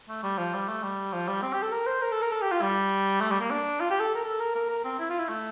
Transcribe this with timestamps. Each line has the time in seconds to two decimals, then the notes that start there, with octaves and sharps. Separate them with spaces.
0.09 A3
0.23 G3
0.38 F3
0.54 G3
0.68 A3
0.83 G3
1.13 F3
1.28 G3
1.42 C4
1.53 G4
1.62 A4
1.72 A#4
1.86 C5
2.02 A#4
2.12 A4
2.22 A#4
2.31 A4
2.41 G4
2.51 F4
2.62 G3
3.20 A3
3.31 G3
3.40 A#3
3.50 D4
3.80 F4
3.90 G4
4.00 A4
4.15 A#4
4.24 A4
4.40 A#4
4.55 A#4
4.69 A#4
4.84 C4
4.99 E4
5.10 F4
5.19 E4
5.28 A3